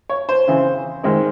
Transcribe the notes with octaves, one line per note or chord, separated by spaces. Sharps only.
C#5
C5
C#3 E3 C4
D#3 G#3 C4